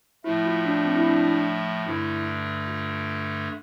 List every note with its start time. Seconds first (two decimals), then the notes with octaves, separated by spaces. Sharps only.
0.24 A2 F3 A3 E4
0.45 F4
0.65 D4
0.85 C4
0.96 E4
1.05 D4
1.86 G2 D3 A3 E4
2.67 F4